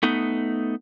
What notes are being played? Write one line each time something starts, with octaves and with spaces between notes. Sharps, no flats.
A3 B3 D#4